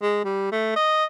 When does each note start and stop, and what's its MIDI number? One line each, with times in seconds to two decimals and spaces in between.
0.02 0.20 56
0.25 0.50 55
0.52 0.73 57
0.76 1.05 75